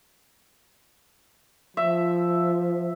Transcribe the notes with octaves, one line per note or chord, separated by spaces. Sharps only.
F3 E5